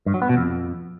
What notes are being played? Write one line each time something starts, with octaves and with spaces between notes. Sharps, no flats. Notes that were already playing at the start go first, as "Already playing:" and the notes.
G2
F#3
B3
B2
F2